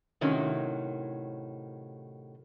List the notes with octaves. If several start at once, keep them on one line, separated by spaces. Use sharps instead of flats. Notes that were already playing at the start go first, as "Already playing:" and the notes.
A2 C3 D#3 F#3 C#4